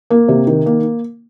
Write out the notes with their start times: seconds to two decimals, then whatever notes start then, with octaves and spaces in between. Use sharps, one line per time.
0.10 A#3
0.28 C3
0.47 D#3
0.66 A#3